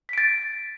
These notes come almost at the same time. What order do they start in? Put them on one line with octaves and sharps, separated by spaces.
B6 D7 A6